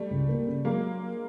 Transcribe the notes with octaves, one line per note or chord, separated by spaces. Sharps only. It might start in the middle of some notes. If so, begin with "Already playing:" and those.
Already playing: G3 A3
C#2
A#3
C#3
F#3 G#3 A#3